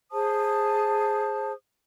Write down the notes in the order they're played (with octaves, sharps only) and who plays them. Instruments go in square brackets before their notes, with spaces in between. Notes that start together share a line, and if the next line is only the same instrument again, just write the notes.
[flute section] G#4 C5 A5 D#6